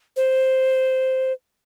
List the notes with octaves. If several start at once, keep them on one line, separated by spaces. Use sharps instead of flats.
C5